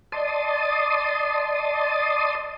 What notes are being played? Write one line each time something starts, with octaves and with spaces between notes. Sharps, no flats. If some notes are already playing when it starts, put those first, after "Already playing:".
D5 D#5 A5 C6 D#6